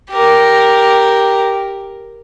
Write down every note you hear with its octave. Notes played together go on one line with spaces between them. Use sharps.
G4 A#4